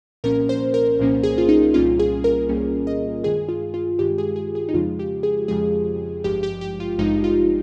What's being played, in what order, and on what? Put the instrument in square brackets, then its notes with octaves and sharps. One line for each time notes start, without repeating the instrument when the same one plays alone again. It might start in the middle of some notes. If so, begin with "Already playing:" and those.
[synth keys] C2 A#2 F3 A#3 C#4 A#4
C5
A#4
C2 A#2 F3 A#3 C#4
G#4
F4
D#4
C2 A#2 G3 A#3 C#4 F4
G#4
A#4
C2 A#2 G3 A#3 C#4
D#5
G2 D#3 G#3 G#4
F4
F4
G2 D#3 G#3 G4
G#4
G#4
G#4
D#4
F2 C#3 F3 G#3 F4
G4
G#4
F2 C#3 F3 G#3 G#4
G#1 G2 F3 G#3 G4
G4
G4
F4
G#1 G2 F3 G#3 D#4
F4